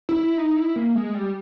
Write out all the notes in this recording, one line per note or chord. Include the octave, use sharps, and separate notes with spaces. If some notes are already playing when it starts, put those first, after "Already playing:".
E4
D#4
E4
A#3
G#3
G3